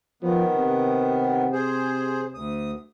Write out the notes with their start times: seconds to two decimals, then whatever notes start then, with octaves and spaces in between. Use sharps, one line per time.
0.23 D#3 F3 B3
0.55 C3
1.52 G#4 C5
2.34 D2 D#6